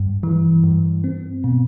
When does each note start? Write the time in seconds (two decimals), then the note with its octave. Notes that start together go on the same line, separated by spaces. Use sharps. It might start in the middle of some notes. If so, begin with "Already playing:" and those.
Already playing: G2
0.23 E3
0.64 G2
1.04 C4
1.44 B2